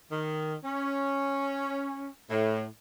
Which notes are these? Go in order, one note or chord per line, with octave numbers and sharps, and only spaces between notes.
D#3
C#4
A2